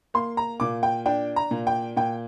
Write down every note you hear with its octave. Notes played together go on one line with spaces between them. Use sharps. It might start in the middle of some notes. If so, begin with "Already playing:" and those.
A#3 C6
A#5
A#2 D6
G5
D4 G5
A#5
A#2
G5
A#2 G5